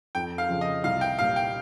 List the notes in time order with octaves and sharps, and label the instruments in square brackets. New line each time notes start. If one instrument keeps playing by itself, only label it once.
[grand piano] F2 [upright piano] G5
[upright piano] F5
[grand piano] C#3 F3
[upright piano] D#5
[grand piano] C2 [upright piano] F5
[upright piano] G5
[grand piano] A#2 G3 [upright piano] F5
[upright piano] G5